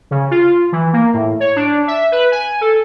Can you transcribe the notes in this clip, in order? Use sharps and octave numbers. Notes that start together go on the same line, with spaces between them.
C#3
F4
E3
A#3
A2
C#5
D4
E5
B4
G#5
A4